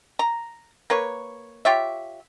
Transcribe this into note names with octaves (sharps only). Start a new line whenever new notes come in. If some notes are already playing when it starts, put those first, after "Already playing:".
A#5
A#3 B4 C#5
F4 G4 C#5 E5